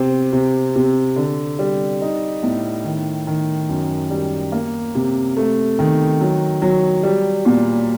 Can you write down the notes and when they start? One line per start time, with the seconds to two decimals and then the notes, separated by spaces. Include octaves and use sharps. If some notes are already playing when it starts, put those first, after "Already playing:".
Already playing: C3 C4
0.33 C3
0.75 C3
1.16 D3
1.59 G3
2.01 D#4
2.43 A2
2.84 D#3
3.27 D#3
3.69 F#2
4.10 G3
4.52 A#3
4.95 C3
5.37 A3
5.79 D#3
6.21 F#3
6.62 F#3
7.03 G3
7.45 A#2